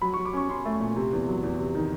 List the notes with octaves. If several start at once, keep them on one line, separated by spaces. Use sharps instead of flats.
F#3 B5
C#6
F#3
D6
C#4 C#6
C#4 C6
A3
A#2
C3
E2
F#3
E2
C3
D#3